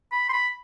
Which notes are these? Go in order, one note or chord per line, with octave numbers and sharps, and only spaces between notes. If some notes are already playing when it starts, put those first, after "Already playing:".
B5
C6
B5